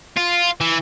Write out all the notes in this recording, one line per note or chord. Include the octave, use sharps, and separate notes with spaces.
F4
E3